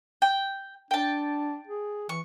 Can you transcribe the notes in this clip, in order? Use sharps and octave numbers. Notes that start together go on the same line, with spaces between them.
G5
D4 G5 A5
G#4
E3 C#6